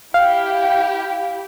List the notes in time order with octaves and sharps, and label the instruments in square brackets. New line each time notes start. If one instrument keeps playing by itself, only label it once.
[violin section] E4 G4 [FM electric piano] F5